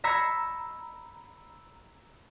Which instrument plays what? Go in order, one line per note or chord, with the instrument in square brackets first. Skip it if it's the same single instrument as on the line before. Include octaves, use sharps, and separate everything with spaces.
[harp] A#5 B5 E6 G#6 C7 C#7